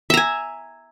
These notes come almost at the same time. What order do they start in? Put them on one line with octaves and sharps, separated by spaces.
E5 A#5 G#5